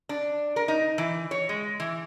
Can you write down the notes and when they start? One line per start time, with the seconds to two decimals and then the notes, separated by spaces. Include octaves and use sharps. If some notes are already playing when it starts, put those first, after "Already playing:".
0.09 D4
0.56 A#4
0.68 D#4
0.98 E3
1.31 C#5
1.49 G#3
1.80 E3